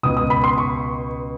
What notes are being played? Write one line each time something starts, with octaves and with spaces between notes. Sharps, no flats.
C#2 B2 D#6
D#6
B5
C6
C#6